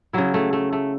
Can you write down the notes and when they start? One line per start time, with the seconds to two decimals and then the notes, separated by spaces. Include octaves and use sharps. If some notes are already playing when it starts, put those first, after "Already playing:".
0.13 C#3 F#3 E4
0.34 A3
0.53 A3
0.73 A3